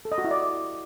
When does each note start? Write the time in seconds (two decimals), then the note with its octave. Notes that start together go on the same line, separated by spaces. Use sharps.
0.05 A4
0.12 D#5
0.18 F#4
0.24 E4
0.31 D5